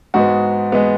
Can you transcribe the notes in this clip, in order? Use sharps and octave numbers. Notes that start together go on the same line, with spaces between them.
G#2 G#3 B3 F#4
G#3 B3